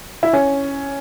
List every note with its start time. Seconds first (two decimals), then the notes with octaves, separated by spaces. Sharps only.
0.23 E4
0.33 C#4